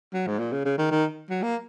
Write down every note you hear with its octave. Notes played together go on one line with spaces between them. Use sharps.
F#3
G#2
A#2
C#3
C#3
D#3
D#3
F#3
A#3